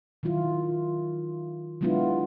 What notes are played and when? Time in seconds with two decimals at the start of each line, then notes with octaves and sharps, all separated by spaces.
0.23 D#3 F#3 E4 F4
1.81 F#3 G#3 B3 D4 E4 F4